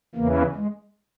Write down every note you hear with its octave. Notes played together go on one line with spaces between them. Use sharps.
E2 C#3 E3 A#3
G#3